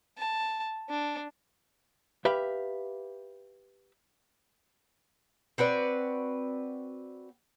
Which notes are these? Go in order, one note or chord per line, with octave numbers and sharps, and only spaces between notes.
A5
D4
G4 B4 E5 F5
C4 F#4 B4 D5